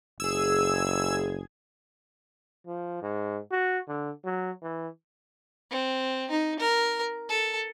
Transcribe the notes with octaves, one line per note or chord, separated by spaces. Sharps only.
F#1 G#4 E6 G#6
F3
G#2
F#4
D3
F#3
E3
C4
D#4
A#4
A4